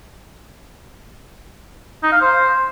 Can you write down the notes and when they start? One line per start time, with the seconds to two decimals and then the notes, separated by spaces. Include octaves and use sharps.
2.03 D#4
2.12 F5
2.21 C5